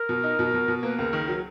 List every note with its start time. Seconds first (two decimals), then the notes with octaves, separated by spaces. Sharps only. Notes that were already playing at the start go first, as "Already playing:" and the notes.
Already playing: A#4
0.09 B2
0.24 D#4
0.39 B2
0.54 B2
0.68 B2
0.83 A#3 B4
0.99 C#2 A#4
1.13 D#3
1.28 F#3